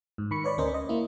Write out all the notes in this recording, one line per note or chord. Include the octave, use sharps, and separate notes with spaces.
G#2
D#3 B5 C#6 C#7
B4 C#5 D5 B5
D2 C#4 A#4 C5 D#5
D#5
A#3 E4